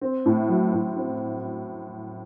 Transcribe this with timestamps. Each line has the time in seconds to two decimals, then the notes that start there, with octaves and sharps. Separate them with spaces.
0.01 C4
0.26 A2
0.49 F#3
0.73 A2
0.96 C4